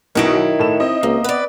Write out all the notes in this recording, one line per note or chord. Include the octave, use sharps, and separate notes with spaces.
B1 B2 D#3 D#4 E4 C#5 D7
F#3
A2 A4 E7
C4 D#5
C#2 A#3
B3 B4 D5